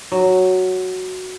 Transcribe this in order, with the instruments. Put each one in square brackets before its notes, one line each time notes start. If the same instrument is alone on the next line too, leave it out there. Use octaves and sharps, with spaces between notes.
[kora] F#3